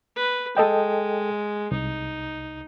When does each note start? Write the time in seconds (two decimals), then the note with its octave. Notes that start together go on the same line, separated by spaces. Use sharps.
0.16 B4
0.57 G#3 A4 D#5 G5
1.71 C2 D#4